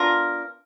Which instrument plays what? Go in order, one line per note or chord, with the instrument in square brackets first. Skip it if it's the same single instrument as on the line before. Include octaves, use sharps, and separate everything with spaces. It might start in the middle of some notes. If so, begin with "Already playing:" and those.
Already playing: [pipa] B3 D4 F4 A#4